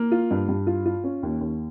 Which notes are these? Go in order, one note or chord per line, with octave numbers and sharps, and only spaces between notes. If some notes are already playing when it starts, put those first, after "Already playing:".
Already playing: A#3
F4
G2
G2
F4
F4
C#4
D#2
D#2